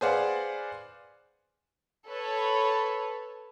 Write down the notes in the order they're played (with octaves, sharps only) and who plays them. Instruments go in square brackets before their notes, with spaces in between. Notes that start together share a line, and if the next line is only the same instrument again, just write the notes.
[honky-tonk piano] G#4 B4 C5 D5 F5 F#5
[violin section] A4 B4 C#5